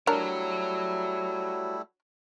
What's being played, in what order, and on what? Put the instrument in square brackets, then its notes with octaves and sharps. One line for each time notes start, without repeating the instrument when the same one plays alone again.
[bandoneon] G3 A3 E4 [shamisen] D4 A#4 [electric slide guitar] F#4 C#5